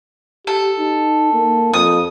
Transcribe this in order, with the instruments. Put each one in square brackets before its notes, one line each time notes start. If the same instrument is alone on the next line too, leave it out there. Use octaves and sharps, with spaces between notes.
[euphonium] G4 [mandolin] A4
[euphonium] D#4
A#3
[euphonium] F2 [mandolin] D#6